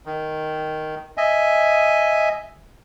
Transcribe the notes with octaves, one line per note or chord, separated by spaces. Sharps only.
D#3
D#5 E5 G#5